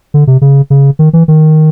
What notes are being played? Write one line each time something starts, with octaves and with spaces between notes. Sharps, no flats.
D3
C3
C#3
C#3
D#3
E3
D#3